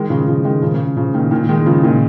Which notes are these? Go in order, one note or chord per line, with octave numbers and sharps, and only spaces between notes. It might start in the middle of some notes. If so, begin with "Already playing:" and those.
Already playing: D#3 G#3
C#3 F3
C#3 F3
D#3 G#3
C#3 F3
C#3
C#3 F3
A#2 D#3
A#2 D#3
D#3 G#3
C#3 F3
A#2 D#3